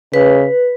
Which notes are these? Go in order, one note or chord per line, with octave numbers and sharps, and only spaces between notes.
C#3 B4